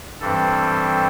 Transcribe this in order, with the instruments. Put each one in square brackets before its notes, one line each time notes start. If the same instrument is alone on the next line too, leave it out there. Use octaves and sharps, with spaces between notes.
[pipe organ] G2 E3 G3 C4 A4